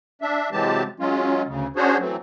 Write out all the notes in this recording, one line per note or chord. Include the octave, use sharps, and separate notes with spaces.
D4 E5
C3 E3 F#3 G#3 G4 A5
F#3 G#3 C#4 F4
D2 C#3
C#4 D4 F#4 G#4 C5 C#5
E3 F#3 A3 C4